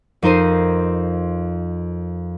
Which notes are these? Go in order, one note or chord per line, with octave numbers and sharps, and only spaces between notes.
F2 D#4 A#4 C5 C7 D#7